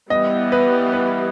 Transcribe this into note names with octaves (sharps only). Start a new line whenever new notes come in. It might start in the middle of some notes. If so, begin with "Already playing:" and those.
E3 G3 B3 D#5
B4
B4